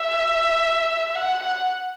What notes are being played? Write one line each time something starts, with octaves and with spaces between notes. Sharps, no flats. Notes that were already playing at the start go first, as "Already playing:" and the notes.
Already playing: E5
F#5
F#5